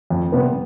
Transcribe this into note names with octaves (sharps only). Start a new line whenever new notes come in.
F2
C3 G3 B3